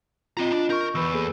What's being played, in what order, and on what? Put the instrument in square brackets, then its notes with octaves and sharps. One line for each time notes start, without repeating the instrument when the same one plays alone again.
[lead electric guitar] C4 A#5 [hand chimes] F4 D#5
[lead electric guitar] D4
[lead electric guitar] A#4 [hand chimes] C#6 G6
[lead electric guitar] E2 [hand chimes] B4 B5 E6
[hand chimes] A#3 G#4 A4